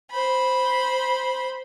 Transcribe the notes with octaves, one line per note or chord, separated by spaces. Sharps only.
C5 B5